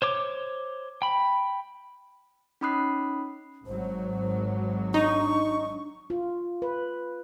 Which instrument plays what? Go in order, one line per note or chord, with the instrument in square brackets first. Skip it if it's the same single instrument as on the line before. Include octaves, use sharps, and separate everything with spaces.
[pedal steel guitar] C5 C#5 D6
G5 B5
[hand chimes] C#4 D#4 B5 D#6 F#6 C7
[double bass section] G#1 F#3 [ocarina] C5
[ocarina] D4 [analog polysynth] D#4 [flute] C#6
[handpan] F4
B4